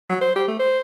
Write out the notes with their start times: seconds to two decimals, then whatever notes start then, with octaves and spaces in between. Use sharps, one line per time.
0.09 F#3
0.21 C5
0.36 G4
0.48 A3
0.59 C5